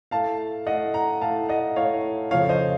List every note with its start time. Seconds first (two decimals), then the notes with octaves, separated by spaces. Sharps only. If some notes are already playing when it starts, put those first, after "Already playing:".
0.11 A2 A3 F5 A5
0.66 A2 A3 D#5 F#5
0.94 F#5 A#5
1.21 A2 A3 F5 A5
1.49 D#5 F#5
1.76 A2 A3 C#5 F5
2.31 F2 C#3 F3 A3 C#5 F5
2.49 C5 D#5